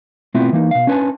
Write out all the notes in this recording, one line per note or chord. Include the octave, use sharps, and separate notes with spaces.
B2 A3 B3 C4 E4 F4
E3 A#3 D#4
B2 F5
C#4 D4 B4 C5 G#5 A5